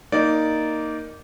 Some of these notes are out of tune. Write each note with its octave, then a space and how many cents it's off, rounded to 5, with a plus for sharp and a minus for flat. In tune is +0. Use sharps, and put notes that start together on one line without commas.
A#3 +0 D#4 +0 D5 -15